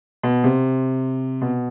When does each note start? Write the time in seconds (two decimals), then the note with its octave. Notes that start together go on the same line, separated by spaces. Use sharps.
0.23 B2
0.44 C3
1.42 B2